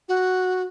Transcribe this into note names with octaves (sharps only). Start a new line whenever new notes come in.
F#4